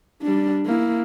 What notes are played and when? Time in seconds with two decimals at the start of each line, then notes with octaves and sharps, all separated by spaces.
0.23 G3 D4
0.66 A#3 E4